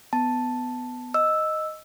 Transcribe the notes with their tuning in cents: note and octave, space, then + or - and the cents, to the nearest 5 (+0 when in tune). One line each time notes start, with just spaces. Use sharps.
B3 +15 A5 +0
D#5 +0 E6 +0